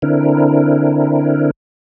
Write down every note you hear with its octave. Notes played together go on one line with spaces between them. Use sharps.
D3 C4 D4 E4 A#4